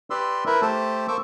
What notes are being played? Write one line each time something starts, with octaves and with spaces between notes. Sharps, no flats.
G4 B4 D5 C6 E6
E4 A#4 B4 E5
A3 G4 A4 C5 A5
A#3 C5 C#6 D6 E6